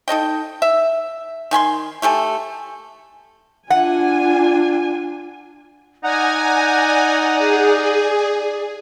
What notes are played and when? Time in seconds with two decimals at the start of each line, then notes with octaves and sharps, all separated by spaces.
0.08 D#4 A4 D#5 G5
0.62 E5
1.51 D#3 G#5 B5 C6
2.02 A3 G4 A4 G#5
3.70 D4 F4 F#5 G#5
6.04 D#4 D5 F#5 G#5 A#5
7.38 G#4